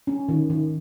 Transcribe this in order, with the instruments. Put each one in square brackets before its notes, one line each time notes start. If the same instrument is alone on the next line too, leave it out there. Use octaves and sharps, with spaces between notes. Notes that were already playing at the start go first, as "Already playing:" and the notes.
[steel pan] C#4
D#3
D#3